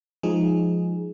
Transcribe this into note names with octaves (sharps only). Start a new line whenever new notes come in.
F3 G#3 D#4 G#4